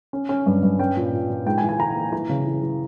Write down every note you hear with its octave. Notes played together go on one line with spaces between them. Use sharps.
C#4
C#4
G2
G2
C#4 G5
A#2
A#2
A#2
G#2 G5
G#5
E3
G#5
E3 A#5
A#3
E3 A#5
C#3
E3
E3